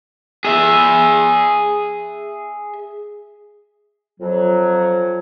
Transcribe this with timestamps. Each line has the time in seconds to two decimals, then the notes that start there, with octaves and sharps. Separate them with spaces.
0.45 G#4 E5
4.20 F2 F#3